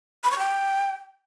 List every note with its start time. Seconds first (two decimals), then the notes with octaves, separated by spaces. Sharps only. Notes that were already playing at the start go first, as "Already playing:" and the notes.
0.24 B5
0.31 C#6
0.39 G5